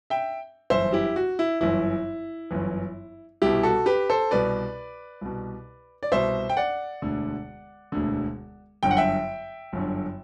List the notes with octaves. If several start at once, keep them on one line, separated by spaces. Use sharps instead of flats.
E5 G5
G1 F#2 E3 C5 E5
E4 G4
F#4
E4
G1 F#2 E3 E4
G1 F#2 E3
C2 B2 E4 G4
F#4 A4
G4 B4
A4 C5
C2 B2 B4 D5
C2 B2
D5
C2 B2 C5 E5
G5
D5 F#5
E1 D2 D3
E1 D2 D3
G1 F#2 D3 G5
F#5
E5 G5
G1 F#2 D3